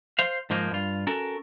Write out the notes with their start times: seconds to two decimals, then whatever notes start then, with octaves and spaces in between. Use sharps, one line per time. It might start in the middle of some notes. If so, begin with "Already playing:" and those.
0.19 C5 F5
0.50 G#2 F3 A#3 D#4
0.71 G2 F4
1.07 C#4 F#4 A4 A#4